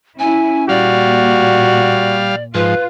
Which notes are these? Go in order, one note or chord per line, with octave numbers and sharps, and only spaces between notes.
C#4 E4 G#5
A#2 G3 F#4 D5 F5
G#2 F3 F4 B4